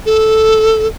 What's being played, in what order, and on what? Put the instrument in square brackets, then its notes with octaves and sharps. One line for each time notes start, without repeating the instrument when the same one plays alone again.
[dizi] A4